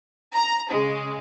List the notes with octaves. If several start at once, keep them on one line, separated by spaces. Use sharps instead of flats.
A#5
C#3 G#3